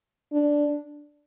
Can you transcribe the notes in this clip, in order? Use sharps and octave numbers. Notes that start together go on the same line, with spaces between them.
D4